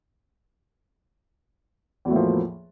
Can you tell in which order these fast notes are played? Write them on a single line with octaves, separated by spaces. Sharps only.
E2 F#3 A2 A#3 F3